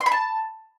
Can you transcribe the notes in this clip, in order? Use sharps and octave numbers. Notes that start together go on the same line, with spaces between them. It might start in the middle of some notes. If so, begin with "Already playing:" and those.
C6
B5
A5